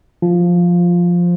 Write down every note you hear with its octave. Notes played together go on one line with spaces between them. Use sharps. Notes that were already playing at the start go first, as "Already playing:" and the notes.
F3